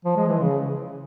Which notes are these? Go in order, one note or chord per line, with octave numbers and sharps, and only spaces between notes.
F3
G#3
E3
C#3